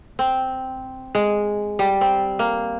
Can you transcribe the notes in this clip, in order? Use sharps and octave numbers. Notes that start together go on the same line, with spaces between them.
C4
G#3
G3
C4
A#3